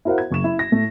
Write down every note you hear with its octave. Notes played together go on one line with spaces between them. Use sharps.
E4 F#4 A#4 C5 F5 F#5
G#6
F#1 C#6 E7
E4
A#6
A2 A3